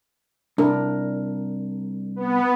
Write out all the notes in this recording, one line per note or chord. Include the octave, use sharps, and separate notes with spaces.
C2 D4 A#4
B3